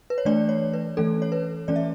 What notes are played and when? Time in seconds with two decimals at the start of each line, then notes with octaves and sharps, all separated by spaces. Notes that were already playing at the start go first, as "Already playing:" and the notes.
0.10 B4
0.18 C#5
0.25 E3 A3 D4 D5
0.49 C#5
0.73 B4
0.97 E3 A3 C#4 A4
1.22 C#5
1.32 B4
1.68 E3 A3 C#4 D5
1.76 E5